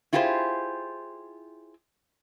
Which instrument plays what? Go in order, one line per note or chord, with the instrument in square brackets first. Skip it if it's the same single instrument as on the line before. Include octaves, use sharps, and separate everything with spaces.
[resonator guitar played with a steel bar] E4 F4 G4 G#4 B4 C5